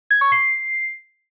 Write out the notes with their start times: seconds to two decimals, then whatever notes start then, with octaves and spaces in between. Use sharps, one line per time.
0.11 G#6
0.21 C#6
0.32 C7